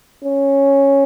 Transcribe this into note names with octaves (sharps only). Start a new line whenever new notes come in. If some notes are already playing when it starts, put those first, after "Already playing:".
C#4